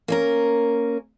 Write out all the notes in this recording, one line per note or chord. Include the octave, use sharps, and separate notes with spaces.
A#3 C#4 A#4